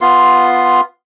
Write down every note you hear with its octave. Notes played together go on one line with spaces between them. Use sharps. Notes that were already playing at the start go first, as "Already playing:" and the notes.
B3 F4 C6